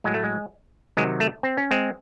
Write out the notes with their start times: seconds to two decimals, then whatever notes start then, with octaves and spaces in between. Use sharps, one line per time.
0.04 A2 F#3 G#3
0.14 A3
0.24 G#3
0.97 C3 D#3 F#3 G#3
1.20 A3
1.43 C4
1.57 C#4
1.71 G#3 C4